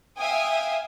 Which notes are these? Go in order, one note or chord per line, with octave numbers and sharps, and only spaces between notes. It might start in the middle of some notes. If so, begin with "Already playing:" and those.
E5 F5 G5 G#5 D#6